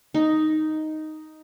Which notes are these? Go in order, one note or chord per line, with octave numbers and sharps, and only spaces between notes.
D#4